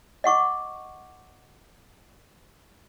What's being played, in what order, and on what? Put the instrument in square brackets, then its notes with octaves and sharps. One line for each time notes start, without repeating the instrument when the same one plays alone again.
[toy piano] D#5 F#5 C#6 D6